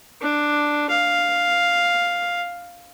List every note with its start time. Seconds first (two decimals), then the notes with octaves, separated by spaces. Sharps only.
0.21 D4
0.90 F5